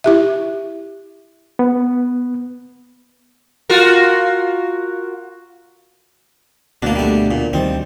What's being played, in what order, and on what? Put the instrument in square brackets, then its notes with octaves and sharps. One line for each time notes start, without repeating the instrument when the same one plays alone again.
[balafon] E4 G4 E5
[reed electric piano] B3
[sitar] F4 F#4 A#4
[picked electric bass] D2 B2 [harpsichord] A#3 D4
[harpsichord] G3 A3
A#2
[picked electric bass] D2 D#3 G3 [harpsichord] C4